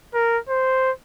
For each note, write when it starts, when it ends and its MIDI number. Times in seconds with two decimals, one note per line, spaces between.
0.14 0.38 70
0.49 0.91 72